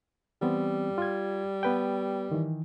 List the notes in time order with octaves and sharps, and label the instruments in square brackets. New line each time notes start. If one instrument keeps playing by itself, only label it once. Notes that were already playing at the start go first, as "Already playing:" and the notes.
[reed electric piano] E3 B3 C4 [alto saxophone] G3
[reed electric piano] F4 G#6
B3 B4 G5
D#3 E3